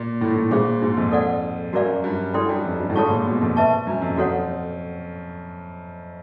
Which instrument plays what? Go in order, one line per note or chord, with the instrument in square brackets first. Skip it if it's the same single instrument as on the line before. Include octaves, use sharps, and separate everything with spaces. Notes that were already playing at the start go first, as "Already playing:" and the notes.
Already playing: [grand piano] A#2
A2
A2
[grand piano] A#2 [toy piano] D4 F4 G#4 C5 F5
[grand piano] G#2
F2
[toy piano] A4 D5 F#5
[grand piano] F#2 [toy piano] F#4 A#4 D5 F5
[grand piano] G2
[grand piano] F#2 [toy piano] E4 A4 D5 G5 C6
[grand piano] G2
F2
G2
A2
[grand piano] G#2 [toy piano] A4 C#5 F5 A5 C#6
[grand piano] A#2
B2
F2
[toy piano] B4 E5 A5 C#6
[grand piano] F#2
F2
[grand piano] F2 [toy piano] F#4 A4 C#5 F#5